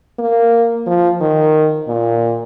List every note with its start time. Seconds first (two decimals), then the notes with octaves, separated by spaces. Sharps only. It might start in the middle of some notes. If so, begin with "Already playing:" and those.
0.19 A#3
0.87 F3
1.21 D#3
1.88 A#2